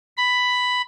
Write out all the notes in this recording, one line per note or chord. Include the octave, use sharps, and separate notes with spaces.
B5